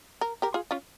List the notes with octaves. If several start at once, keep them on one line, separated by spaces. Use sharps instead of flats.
A#4
G4 A#4
F4 G#4
C#4 F4